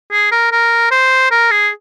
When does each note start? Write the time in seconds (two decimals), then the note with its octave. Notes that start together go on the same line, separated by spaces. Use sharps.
0.12 G#4
0.32 A#4
0.52 A#4
0.91 C5
1.31 A#4
1.51 G#4